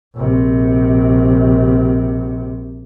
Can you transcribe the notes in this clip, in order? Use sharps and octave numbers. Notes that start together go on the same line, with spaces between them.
A#1 C3